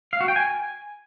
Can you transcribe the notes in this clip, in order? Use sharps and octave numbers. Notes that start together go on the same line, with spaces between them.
F5
F#4
G5
G#5